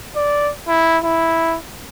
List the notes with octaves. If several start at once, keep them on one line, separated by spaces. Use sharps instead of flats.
D5
E4
E4